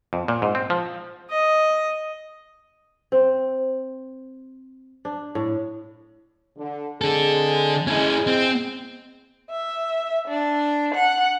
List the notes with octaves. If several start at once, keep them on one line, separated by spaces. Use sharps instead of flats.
F2
A#2
G#2
C4
F3
D#5
C4
D4
A2
D3
D3 G#3 C4 G#4 A4
G#3 C#4 E4 G#4
C4
E5
D4
F#5